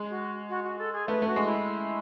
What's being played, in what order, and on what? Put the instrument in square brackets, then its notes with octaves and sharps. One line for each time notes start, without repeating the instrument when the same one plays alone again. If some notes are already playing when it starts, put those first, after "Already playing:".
Already playing: [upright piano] G#3
[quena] F#4
F#4
F#4
A4
G#4
[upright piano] A3 [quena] B4
[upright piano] A3
[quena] F#4
[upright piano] G#3
[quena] E4